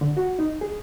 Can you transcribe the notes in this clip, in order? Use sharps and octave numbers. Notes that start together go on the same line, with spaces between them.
D3
F#4
D#4
G#4